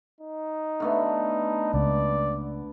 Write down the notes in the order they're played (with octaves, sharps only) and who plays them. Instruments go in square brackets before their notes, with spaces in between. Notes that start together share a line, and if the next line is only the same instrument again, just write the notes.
[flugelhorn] D#4
[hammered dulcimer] D3 A3 B3
[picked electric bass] C#2 [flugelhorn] D5